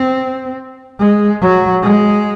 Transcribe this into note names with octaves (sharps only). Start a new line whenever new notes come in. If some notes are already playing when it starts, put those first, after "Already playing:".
Already playing: C4
G#3
F#3
G#3